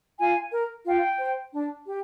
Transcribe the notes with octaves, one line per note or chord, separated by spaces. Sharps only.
F4 G#5
A#4
F4 G5
C5
D4
G4